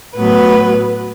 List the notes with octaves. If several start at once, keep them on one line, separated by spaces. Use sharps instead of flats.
A2 F#3 B3 B4